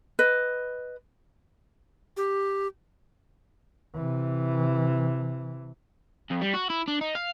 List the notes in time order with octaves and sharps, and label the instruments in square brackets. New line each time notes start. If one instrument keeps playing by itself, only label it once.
[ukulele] B4 D#5
[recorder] G4
[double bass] C3 E3
[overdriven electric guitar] F2
G3
F#4
E4
D4
D#4
F5